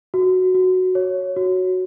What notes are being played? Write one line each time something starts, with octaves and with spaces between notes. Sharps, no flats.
F#4
F#4
C#5
F#4